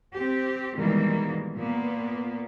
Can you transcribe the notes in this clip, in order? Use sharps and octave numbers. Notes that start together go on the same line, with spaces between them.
C4 G4
B2 D#3 E3 G3 G#3 A#3
A#2 A#3 B3